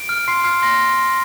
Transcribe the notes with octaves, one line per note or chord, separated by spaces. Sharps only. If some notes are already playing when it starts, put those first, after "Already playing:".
Already playing: D7
F6
C6 C7
F6 C7
C6 A#6